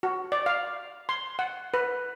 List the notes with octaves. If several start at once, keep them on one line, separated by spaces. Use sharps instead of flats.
F#4
D5
F5
C6
F#5
B4